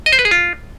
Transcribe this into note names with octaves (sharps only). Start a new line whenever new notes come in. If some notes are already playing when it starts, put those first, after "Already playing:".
D#5
C5
B4
G#4
F4